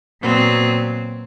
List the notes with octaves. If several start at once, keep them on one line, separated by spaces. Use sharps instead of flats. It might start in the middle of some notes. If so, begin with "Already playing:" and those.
A#2 F#3 B3 C4